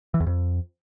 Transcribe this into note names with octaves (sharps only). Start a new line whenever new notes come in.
E3
E2
F2